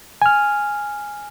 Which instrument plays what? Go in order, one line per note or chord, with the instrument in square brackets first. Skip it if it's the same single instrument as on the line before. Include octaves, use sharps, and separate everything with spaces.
[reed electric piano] G#5 F6